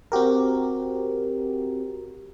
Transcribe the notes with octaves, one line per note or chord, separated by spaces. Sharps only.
C4 F#4 G4 A#4